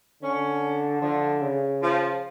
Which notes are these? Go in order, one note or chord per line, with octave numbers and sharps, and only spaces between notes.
D3 C#4
D3 F3
C#3
F3